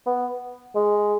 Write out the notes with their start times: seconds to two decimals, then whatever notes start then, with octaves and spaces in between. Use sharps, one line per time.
0.06 B3
0.75 G#3